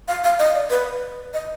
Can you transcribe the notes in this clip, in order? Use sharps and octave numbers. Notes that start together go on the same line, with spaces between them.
F5
F5
D#5
D5
B4
D#5